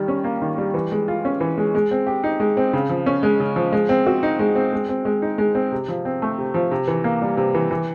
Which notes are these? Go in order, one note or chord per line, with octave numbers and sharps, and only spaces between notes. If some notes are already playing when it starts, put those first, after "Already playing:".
Already playing: D#3 G3
C#4
A#3
D#3
G3
E3
G#3
F4
C#4
E3
G#3
G#3
C4
G4
D#4
G#3
C4
C#3
F3
C#4
G#3
C#3
F3
G#3
C4
F#4
D#4
G#3
C4
G#3
C4
G#3
D#4
G#3
C4
C3
F3
C4
A3
C3
F3
C3
E3
A#3
G3
C3
E3
E3